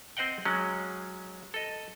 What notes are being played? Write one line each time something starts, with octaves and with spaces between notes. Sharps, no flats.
C4 C5 D#5 F#5 G5
F#3 G#3 C#4
A4 D#5